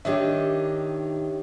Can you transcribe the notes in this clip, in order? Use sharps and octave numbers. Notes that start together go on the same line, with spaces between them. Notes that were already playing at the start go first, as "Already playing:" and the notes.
D#3 D4 D#4 G4 C#5 E5